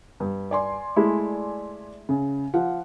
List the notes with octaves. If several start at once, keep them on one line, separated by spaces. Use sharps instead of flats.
G2
D5 G#5 C6
G#3 A3 E4
C#3
F3 F#5